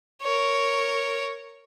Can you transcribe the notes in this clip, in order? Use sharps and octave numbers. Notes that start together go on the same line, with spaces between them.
A#4 C#5